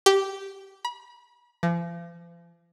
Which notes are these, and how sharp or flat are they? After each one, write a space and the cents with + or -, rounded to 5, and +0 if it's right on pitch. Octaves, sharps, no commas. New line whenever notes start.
G4 -10
B5 -35
F3 -40